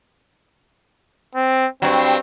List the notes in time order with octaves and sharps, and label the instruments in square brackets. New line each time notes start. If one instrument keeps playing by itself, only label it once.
[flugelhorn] C4
[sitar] G2 F#3 [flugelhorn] C4